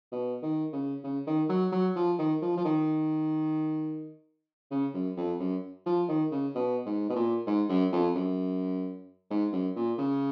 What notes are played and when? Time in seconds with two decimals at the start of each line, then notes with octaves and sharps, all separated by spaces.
0.12 B2
0.43 D#3
0.73 C#3
1.04 C#3
1.27 D#3
1.49 F#3
1.72 F#3
1.96 F3
2.19 D#3
2.42 F3
2.57 F3
2.65 D#3
4.71 C#3
4.94 F#2
5.17 F2
5.40 F#2
5.86 F3
6.08 D#3
6.32 C#3
6.55 B2
6.86 G#2
7.10 B2
7.16 A#2
7.46 G#2
7.69 F#2
7.93 F2
8.15 F#2
9.30 G#2
9.53 F#2
9.76 A#2
9.99 C#3